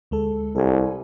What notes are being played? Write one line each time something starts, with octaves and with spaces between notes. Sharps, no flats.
D2 G#3 A4
C2 A4 G#5